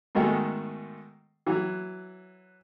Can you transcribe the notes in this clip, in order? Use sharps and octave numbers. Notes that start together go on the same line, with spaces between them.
G#2 B2 D#3 G#3 A3
E3 F#3